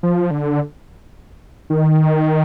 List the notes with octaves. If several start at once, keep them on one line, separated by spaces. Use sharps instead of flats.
F3
D3
D#3